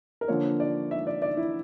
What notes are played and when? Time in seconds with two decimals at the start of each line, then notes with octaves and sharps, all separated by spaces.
0.21 A#4
0.28 D3 F3 A#3 C#5
0.60 D5
0.91 E5
1.07 D5
1.22 D5
1.37 E4